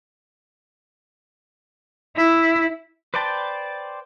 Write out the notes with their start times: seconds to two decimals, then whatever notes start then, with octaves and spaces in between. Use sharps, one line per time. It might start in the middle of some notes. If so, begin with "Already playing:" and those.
2.16 E4
3.14 B4 C5 D5 G5 A5